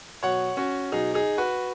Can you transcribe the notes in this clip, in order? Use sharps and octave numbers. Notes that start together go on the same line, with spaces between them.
B2 F#3 C#5 F#5
C#4 F#4
B2 F#3 D#4 G#4
D#4 G#4
F#4 B4